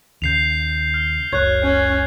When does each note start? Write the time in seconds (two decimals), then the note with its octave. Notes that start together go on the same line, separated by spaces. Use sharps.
0.22 D#2 C#3 G6 C7 F7
0.94 F6
1.32 F#1 C#2 C#5 F#6 G#6
1.64 C#4